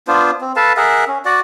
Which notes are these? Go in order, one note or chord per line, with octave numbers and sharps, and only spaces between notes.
B3 D4 F4 C5
C4
A4 B4 F5 A5
G#4 A#4 E5 F#5
C#4
F#4 D5 F#5